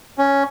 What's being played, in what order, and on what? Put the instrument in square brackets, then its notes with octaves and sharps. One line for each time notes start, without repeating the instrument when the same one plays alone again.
[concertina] C#4